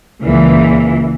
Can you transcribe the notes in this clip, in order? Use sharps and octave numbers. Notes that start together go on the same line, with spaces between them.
C#2 A#2 E3